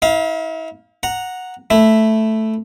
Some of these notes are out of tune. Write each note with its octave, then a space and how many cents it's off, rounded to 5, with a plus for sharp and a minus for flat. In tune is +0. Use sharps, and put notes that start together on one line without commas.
E4 -40 F5 +0
F#5 -10 A#5 +0
A3 +0 E4 +0